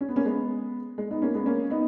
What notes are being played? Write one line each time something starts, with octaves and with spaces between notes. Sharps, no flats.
C#4
B3
A#3 C#4
G#3 B3
G#3
B3 D#4
A#3 C#4
G#3 B3
A#3 C#4
B3 D#4